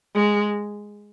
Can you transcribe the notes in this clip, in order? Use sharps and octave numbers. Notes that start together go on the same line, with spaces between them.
G#3